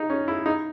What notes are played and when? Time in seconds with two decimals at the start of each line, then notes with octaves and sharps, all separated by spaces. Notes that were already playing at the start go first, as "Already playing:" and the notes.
Already playing: D#4
0.10 C#4
0.28 E4
0.46 D#4